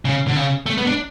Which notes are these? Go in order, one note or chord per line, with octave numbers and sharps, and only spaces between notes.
C#3
D3
C#3
A3
B3
D4